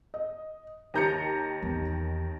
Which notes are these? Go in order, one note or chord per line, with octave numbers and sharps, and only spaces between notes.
D#5
D#2 D#3 G4 A#5 G6 C#7
E2